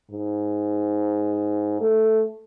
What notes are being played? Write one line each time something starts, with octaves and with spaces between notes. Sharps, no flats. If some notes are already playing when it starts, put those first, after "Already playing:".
G#2
A3